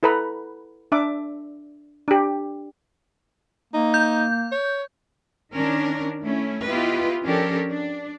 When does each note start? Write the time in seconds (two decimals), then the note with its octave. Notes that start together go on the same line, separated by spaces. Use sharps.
0.03 E4 A4 B4 A#5 B5
0.92 D4 E5 D6
2.08 D4 G4
3.74 A#3 D#4
3.94 G6
4.52 C#5
5.53 D#3 C#4 D4 A#4
6.23 A3 C#4 E4
6.65 B3 E4 F4 G4 B4 D#5
7.25 F3 C#4 D4 G4 A4 A#4
7.70 D4